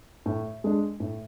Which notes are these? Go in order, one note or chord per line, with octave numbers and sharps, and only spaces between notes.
A2
G#3 D4
A2